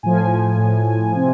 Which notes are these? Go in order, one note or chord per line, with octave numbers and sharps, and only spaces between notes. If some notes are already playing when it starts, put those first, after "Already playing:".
A2 F3 G#5
A2 F3
C3 F3